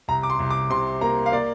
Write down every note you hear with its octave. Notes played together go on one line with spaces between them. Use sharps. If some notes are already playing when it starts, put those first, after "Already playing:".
C2 A#5
D6
C6
C2
D6
C3 C6
A#3 A#5
F5
A#3 D5